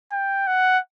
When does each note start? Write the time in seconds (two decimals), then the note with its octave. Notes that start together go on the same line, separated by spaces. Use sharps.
0.12 G5
0.47 F#5